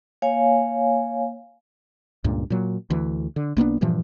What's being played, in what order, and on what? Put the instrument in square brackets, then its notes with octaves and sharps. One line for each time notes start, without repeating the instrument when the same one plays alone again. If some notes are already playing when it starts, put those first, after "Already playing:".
[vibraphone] A#3 C#5 F5 G#5
[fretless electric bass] C#2 G2 A#2
A#2 F#3
D2 E3
D3
B1 A#3 B3 D4
G2 A#2 E3 F3